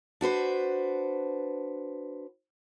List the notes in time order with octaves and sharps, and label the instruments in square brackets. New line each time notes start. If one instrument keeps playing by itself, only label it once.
[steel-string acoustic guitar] D4 F#4 B4 C5